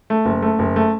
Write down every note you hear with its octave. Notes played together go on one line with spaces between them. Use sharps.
A3
F#1
A3
F#1
A3